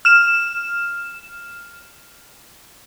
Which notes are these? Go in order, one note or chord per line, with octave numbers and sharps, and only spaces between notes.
F6 E7